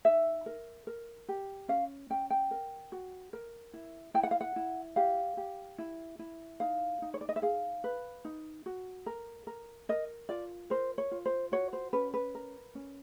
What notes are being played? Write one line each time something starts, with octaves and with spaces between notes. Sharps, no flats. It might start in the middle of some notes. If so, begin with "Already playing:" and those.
D#4 E5
A#4
A#4
G4
C#4 F5
C#4 G5
G5
A#4
F#4
A#4
E4
E4 G5
F#5
F5
F#5
E4
G4 F5
G4
E4
E4
D#4 F5
D#4
C#5
D5
D#5
E5
G#4 F5
B4
D#4
F#4
A#4
A#4
A#4 D#5
F4 D5
A#4 C5
C#5
F4
C5
F#4 C#5
C5
C#4 B4
B4
A#4
C#4